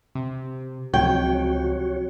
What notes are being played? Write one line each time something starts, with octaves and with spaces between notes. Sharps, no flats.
C3
C#2 C3 F3 F#3 F#4 C#5 G5